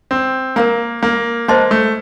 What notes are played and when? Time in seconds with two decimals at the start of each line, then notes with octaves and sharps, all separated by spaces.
0.11 C4
0.56 A#3 A#4 F5 A#5
1.03 A#3
1.48 A#3 C5 D#5 A5 C6
1.71 A3